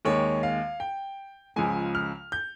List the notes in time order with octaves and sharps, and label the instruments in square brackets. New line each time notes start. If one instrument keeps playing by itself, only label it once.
[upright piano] D#2 D#3 G#3 C#5
F5
G5
C#2 C#3 F3 G#3 G#5
F6
G6